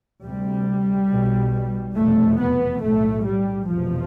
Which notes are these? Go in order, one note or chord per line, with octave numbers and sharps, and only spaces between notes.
D2 C3 G3
B1 B2
F1 E2 B2 A3
B3
B1 A2 A3
G3
F1 E2 B2 F3